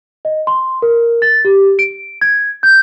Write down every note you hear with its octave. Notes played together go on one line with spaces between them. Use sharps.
D#5
C6
A#4
A6
G4
D7
G#6
G6